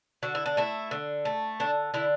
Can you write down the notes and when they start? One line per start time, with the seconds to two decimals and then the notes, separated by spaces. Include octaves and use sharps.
0.23 D3 F#4
0.35 E4
0.46 D4
0.57 A3 E4
0.91 D3
1.25 A3
1.60 D3 D4
1.94 D3 E4